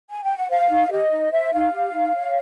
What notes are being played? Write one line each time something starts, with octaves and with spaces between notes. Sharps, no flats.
G#5
G5
F#5
C5 F5
D#4
E5
G4 D#5
D#4
C5 E5
D#4 F5
G4
D#4
C#5